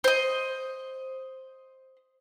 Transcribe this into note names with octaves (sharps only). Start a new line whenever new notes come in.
C5 D#5